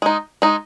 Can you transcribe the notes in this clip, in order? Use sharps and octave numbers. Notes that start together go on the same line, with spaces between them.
G#3 D#4
G#3 D#4